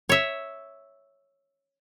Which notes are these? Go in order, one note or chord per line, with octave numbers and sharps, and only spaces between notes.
C#5 E5